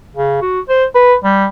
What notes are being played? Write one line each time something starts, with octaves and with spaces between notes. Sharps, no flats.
C#3
F#4
C5
B4
G3